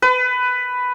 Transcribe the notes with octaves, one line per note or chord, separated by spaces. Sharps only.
B4